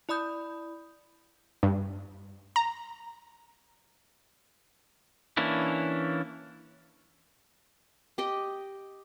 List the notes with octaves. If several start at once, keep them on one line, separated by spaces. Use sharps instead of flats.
E4 D5 B5 D#6 G6
G2
A#5
E3 A#3 C#4 D4 E4
G4 D#5 G5